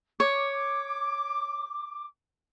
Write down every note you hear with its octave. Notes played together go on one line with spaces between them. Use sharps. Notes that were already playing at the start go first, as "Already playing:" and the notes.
C#5 D6